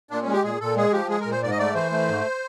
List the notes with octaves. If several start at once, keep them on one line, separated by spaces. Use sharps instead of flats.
A#2 D4
G#3 C#4
G4
A#2 G#4
A#2 A4
G#3 G#4
F3 G4
G#3 G#4
A#2 A#4
C5
G#2 D5
D#5
A3 D5
E3 C5
A3
G#2